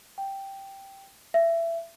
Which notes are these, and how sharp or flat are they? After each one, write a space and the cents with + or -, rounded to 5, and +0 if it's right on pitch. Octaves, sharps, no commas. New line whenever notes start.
G5 -5
E5 +25